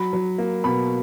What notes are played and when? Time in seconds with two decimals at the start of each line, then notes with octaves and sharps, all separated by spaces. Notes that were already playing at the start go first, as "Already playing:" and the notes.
Already playing: F#3 B5
0.13 F#3
0.38 A#3
0.64 B2 B5